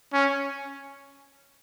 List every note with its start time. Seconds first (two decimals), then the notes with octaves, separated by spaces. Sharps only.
0.13 C#4